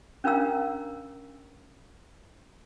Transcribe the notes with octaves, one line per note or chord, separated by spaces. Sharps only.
C#4 D4 A#4 F5 A#5 E6